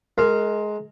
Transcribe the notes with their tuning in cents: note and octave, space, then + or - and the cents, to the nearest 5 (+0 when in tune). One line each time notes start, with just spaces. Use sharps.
G#3 +20 A#4 -10